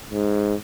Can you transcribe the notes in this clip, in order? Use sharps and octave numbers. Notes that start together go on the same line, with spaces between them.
G#2